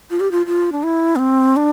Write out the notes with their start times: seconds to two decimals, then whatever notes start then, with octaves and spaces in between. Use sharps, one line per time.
0.11 F4
0.20 G4
0.32 F4
0.47 F4
0.72 D4
0.83 E4
1.16 B3
1.19 C4
1.56 D4